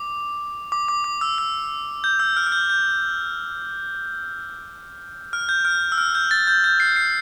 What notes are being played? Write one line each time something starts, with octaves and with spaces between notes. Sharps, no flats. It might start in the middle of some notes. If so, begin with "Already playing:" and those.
Already playing: D6
D6
D6
D6
E6
E6
G6
E6
F6
F6
G6
G6
F6
G6
F6
E6
F6
G6
A6
G6
G6
C7
C7